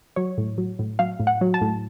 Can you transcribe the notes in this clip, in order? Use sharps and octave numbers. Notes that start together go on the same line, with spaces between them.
F#3 C#5
A2
F#3
A2
F#3 F5
A2
F#5
F#3
A5
A2